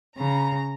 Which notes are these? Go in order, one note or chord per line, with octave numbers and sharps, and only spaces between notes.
C#3 A#5